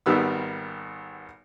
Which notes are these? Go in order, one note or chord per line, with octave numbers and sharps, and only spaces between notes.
G#1 D#3 G3 B3 E6